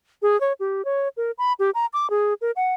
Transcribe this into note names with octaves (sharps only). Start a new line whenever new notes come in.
G#4
C#5
G4
C#5
A#4
B5
G4
A#5
D6
G#4
A#4
F#5